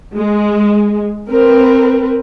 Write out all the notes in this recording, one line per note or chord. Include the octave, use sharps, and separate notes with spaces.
G#3
C4 A#4 B4